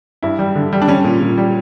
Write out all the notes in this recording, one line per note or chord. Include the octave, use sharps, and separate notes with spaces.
G2 E4
G3
D3
G3
D4
G3 C#4
A#2
A#2
G3